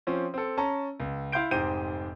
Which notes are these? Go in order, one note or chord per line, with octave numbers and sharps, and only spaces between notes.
F3 C4 C#4
C4 A4
C#4 A5 A#5
C#2
E4 F5 C6 G6 D7
F1 G#2 G4 C5 G6 D#7